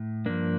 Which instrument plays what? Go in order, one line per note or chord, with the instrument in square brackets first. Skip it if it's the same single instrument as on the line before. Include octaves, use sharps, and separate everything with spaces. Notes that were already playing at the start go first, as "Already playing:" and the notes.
Already playing: [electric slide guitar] A2
G2 F3 A#3 D4